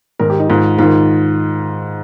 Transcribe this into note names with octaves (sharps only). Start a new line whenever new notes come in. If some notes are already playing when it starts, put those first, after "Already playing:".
G#2 D#3 A#4
G4
D#4
G#2 D#3 F4
G#2 D#3 F4